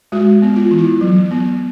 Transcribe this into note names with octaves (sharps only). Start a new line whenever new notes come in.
G#3 F#4
B3
F4
E3
E4
F#3
B3